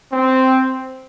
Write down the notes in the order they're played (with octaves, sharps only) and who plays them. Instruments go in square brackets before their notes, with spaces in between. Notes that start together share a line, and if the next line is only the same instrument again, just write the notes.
[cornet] C4